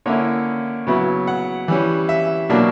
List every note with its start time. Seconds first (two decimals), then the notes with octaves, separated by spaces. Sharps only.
0.06 D3 A#3 C#4 E4 C#5
0.87 C#3 F#3 B3 E4
1.27 F#5
1.68 E3 G3 C#4
2.09 E5
2.49 B2 F#3 A#3 D4